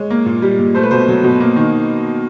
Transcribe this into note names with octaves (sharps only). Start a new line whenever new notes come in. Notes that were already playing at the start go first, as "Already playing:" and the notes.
Already playing: G#3 C#5
A#3
A#2
G3
A#2
A3 C5
B4
B2 C5
F#3
B2
A#3
D#3